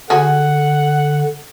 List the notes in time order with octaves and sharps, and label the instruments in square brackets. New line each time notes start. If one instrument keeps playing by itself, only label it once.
[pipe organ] D3 [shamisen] F#4 G#4 [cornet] F#5